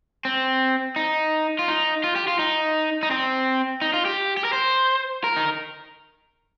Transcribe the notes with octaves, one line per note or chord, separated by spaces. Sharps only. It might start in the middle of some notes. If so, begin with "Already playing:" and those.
C4
D#4
F4
D#4
F4
G4
F4
D#4
D#4
C4
D#4
F4
G4
G4
A#4
C5
A#4
D#4